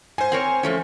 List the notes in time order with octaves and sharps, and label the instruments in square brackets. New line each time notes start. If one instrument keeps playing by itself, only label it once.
[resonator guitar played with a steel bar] G#2 [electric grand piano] C5 G#5
[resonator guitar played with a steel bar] C4 A#4 C#5
F3 A3 C#4